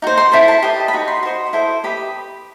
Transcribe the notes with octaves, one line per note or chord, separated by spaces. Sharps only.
D#4 F#4 C5
C6
E4 A4 C5 B5
A5
G4 B4 D#5
B5
D#4 F#4
C6
F#4 C5 D#5
E4 A4 C5
G4 B4 D#5 B5